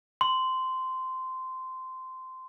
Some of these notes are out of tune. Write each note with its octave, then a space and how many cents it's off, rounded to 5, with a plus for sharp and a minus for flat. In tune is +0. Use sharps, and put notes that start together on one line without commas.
C6 -15